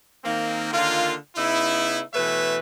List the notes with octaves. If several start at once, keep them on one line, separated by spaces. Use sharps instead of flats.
D#3 A#3 C4
D3 D#3 A#3 F4
C#3 B3 D#4 E4
B2 E3 A3 B4 C#5 E5